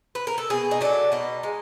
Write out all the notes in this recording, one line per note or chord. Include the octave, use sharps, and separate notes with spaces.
B4
A#4
A4
B2 G#4
D#4
F#3 A3 D4
B2 D#4
G#3